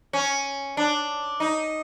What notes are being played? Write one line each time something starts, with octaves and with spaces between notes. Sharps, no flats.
C#4
D4
D#4